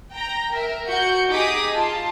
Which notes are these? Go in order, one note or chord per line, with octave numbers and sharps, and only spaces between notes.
G5 A#5
A#4 E5
F#4 G6 C#7
D#4 G4 G#4 D6 D#6 B6
F4 A5